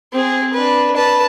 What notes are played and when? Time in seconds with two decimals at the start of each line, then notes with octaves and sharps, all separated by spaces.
0.13 C4 G#4
0.53 D4 B4
0.96 B4 A5